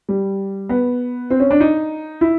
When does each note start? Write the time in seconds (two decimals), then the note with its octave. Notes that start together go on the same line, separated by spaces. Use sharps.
0.09 G3
0.69 B3
1.30 C4
1.40 C#4
1.51 D4
1.60 D#4
2.21 E4